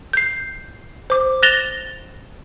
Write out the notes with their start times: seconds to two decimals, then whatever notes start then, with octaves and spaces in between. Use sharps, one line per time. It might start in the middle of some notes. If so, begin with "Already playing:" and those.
0.13 G6 C7
1.10 C5 D6
1.42 F#6 A6 A#6 E7 F7 G7